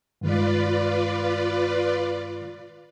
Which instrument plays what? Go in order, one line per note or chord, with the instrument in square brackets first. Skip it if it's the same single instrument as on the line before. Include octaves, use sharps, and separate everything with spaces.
[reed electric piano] G2 D#3 G#3 [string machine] F4 B4 D5